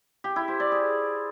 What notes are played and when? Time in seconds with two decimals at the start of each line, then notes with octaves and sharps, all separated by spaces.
0.24 G4
0.36 E4
0.48 C5
0.60 D5
0.72 G#4